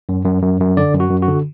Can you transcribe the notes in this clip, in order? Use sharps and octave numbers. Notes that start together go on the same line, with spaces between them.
F#2
F#2
F#2
F#2
D3 D5
F#2
F#4
F#2
F#4
D3